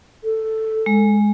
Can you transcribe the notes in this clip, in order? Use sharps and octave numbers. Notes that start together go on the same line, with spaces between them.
A4
G#3